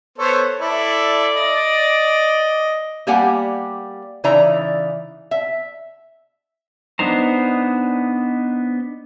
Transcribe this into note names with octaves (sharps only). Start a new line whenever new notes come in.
B3 A4 C5 C#5
E4 A4 D5
D#5
G3 A#3 G4 D5 F#5 G#5
C#3 E3 D#4 D5 E5 A#5
E5
B3 D4 D#4 C5 A#5